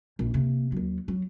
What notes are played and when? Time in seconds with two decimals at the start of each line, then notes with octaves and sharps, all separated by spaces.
0.19 A#1
0.34 C3 A#3
0.72 D#2 F#3
1.08 F#3